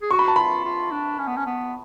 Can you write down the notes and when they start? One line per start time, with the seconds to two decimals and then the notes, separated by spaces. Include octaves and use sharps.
0.02 G#4
0.11 F#4 C#6
0.19 B5
0.28 A5
0.36 F4 B5
0.65 F4
0.92 D4
1.19 C#4
1.27 B3
1.37 C#4
1.46 B3